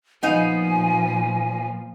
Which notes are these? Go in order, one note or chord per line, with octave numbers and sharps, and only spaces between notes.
A#2 F3 B3 D#4 F5 G#5